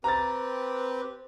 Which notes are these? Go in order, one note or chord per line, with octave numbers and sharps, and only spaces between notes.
C4 G4 B4 A#5 A6